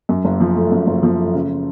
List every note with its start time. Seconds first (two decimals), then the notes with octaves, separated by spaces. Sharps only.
0.09 F#2
0.25 F#1
0.40 F3
0.56 A3
0.71 F#2
0.87 F#1
1.03 F3
1.18 A3
1.34 C#3